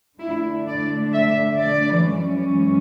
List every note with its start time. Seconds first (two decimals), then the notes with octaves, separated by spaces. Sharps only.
0.19 D3 A3 D4 E4
0.66 D5
1.13 E5
1.60 D5
2.06 F#2 E3 G#3 C#4